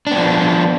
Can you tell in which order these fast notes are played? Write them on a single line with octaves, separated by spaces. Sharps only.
D4 B3 F3